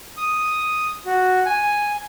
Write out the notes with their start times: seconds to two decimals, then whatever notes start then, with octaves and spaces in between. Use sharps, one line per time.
0.17 D#6
1.06 F#4
1.46 G#5